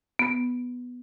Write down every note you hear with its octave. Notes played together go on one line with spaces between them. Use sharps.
B3